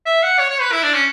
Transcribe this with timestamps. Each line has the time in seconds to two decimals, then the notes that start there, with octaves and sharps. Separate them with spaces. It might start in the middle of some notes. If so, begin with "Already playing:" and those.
0.06 E5
0.23 F#5
0.39 C#5
0.50 C#5
0.61 B4
0.72 E4
0.83 D4
0.94 C#4